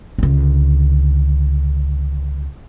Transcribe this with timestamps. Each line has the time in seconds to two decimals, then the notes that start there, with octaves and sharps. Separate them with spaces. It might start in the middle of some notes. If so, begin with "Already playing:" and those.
0.18 C#2 D3